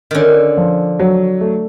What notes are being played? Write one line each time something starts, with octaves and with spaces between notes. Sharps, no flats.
D3 D#3 C#4
F3
F#3
A3